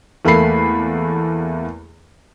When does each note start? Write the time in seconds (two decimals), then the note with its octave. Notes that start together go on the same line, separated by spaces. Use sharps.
0.25 E2 A3 A#3 A4 B5 C7